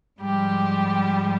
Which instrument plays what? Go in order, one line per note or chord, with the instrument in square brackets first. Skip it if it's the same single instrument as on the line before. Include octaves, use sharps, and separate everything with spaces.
[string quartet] G#2 F3 G3 G4